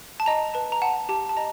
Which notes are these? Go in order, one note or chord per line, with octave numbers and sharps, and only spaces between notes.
A5
D#5 A#5
B4 A5
A#5
F#5 A5
G4 A5
A5
D#5 A#5